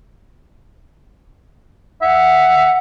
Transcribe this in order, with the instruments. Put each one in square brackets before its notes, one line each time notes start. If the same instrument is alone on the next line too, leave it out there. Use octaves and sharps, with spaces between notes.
[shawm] E5 [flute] F#5